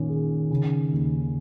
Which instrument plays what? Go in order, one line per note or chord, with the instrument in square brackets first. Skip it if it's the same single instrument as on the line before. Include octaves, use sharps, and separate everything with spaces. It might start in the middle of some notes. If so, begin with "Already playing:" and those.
Already playing: [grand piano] A#2 C#4 [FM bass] D#3
[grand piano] G#4
C#3
D#2